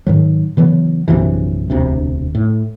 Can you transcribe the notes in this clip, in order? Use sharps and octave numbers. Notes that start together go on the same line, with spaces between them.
G#2 D#3 F#3
C#3 E3 F#3 B3
A#1 F#2 C3 E3
E1 D2 C3
A2